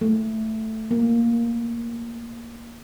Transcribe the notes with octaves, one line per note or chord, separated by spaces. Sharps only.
A3
A#3